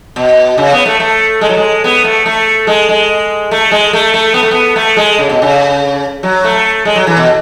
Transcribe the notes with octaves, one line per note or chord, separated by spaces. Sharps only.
B2
C#3
B3
A3
A3
G#3
F#3
G#3
B3
A3
A3
G#3
G#3
A3
G#3
A3
A3
B3
A3
B3
A3
G#3
C#3
B2
C#3
F#3
A3
G#3
F#3
E3
B2